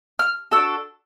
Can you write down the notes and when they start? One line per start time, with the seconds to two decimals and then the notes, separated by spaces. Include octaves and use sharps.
0.19 F6
0.52 D4 F#4 A4 E6